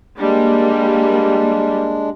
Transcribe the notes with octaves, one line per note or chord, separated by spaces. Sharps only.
G3 G#3 A#3 D4